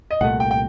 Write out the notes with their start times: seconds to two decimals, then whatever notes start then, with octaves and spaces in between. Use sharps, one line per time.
0.11 D#5
0.21 C2 A#2 A3 F#5
0.40 G5
0.51 G5